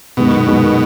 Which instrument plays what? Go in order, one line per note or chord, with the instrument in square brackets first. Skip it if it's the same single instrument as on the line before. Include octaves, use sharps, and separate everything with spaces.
[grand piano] F#2 D#3 G#3 B3 [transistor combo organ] B2
[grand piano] F#2 D#3 G#3 B3